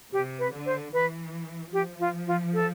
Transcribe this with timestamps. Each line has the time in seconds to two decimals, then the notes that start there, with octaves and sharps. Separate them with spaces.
0.12 C3 G4
0.39 B4
0.52 D3
0.66 C5
0.93 E3 B4
1.73 F3 G4
2.00 F4
2.27 F4
2.54 A4